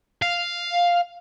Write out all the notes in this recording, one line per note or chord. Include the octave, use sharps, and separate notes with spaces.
F5